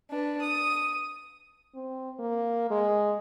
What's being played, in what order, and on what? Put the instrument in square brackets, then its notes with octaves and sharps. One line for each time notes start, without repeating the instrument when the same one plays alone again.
[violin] D4 B4
D#6
[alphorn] C4
A#3
G#3